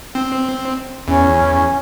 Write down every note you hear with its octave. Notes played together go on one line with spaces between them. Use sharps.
C4
E2 C#4